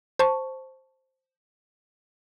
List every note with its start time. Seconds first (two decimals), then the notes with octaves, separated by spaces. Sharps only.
0.19 C5 A5 C#6